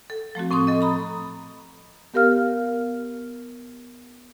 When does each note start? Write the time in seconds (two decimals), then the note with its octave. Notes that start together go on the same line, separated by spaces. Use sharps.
0.10 A4
0.35 F3 A3 C4 F#4
0.51 A2 C4 A5 C6 D#6
0.67 A4 D#5
0.81 A#5 B5 D#6
2.14 B3 G4 A#4 F5 F6